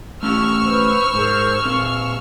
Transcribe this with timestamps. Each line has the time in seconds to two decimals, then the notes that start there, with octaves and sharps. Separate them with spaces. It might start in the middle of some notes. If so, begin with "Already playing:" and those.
0.23 A3 C#4 G4 C#6 E6 F6
0.64 B4 C5
1.13 G#2 G#4 A#4 C5
1.65 A#2 C4 F5